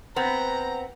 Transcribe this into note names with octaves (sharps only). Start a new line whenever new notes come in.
B3 C4 A#5